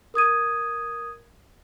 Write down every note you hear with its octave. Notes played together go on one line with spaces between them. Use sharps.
A#4 D#6 G#6 D#7